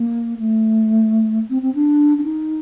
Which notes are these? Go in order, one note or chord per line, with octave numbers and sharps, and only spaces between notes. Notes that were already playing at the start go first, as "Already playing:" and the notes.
Already playing: A#3
A3
C4
C4
D4
D4
D#4